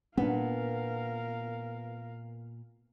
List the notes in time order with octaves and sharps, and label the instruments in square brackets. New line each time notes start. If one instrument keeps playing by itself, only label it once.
[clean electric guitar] A#2 [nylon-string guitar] B3 [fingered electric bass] C4 D4 [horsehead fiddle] A#4 F5